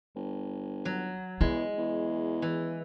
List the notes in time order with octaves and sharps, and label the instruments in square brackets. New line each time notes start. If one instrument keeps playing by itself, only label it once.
[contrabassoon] G1
[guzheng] F#3
[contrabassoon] E2 [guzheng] G#3 [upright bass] E4
[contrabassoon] E2
[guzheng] E3